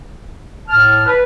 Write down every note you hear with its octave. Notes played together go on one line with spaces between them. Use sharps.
A2 A5 F6
B4